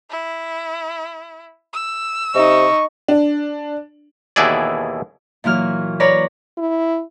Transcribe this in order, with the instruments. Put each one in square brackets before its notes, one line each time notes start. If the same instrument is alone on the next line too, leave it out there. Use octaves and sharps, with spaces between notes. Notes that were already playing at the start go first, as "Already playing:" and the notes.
[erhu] E4
E6
[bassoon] C3 [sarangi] D#4 [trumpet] C#6
[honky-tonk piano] D4
[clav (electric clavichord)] D#2 B2 E3 E4 G#4 D5
[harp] A#2 E3 F#3 F6
B4 C#5 D5 A#5 B5
[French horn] E4